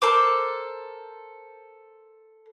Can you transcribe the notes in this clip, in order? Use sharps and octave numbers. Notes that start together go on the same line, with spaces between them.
A4 A#4 C5 D6